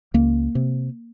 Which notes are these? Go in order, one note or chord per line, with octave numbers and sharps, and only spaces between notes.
C#2 A#3
C3